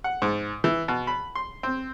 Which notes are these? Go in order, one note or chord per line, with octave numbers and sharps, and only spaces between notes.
F#5
G#2
E3
B2
B5
C6
C4